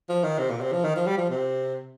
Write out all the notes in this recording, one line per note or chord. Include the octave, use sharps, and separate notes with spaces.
F3
D#3
C3
A#2
C3
F3
D#3
F3
G3
F3
C3